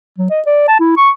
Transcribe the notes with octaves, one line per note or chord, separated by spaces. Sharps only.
F#3
D#5
D5
A5
E4
C#6